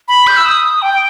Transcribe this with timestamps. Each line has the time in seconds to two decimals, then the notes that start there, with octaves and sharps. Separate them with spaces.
0.08 B5
0.27 G6
0.37 E6
0.46 D#6
0.82 G5